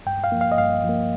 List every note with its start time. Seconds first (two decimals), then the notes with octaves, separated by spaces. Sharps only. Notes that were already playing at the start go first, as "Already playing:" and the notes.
0.06 G2 G5
0.24 F5
0.32 F3 A#3
0.41 F5
0.52 D#5
0.58 G2 F5
0.84 F3 A#3